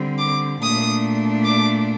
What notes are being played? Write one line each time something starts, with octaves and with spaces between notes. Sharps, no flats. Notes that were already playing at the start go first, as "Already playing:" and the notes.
Already playing: D3 G3 C4
D6
A#2 A3 D4 D#6
D6